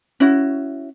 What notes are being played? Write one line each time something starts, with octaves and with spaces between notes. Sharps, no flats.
C#4 E4 F#4